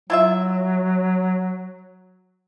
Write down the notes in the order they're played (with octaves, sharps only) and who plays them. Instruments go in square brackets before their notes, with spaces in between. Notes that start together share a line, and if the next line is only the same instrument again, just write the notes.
[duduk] F#3 [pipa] E4 F4 E5